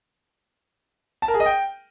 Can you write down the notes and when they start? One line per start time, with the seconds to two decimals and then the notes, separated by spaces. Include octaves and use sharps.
1.22 A5
1.28 A#4
1.34 G#4
1.40 D#5
1.46 G5